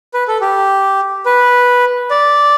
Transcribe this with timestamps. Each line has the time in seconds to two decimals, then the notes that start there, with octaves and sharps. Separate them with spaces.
0.14 B4
0.28 A4
0.41 G4
1.26 B4
2.11 D5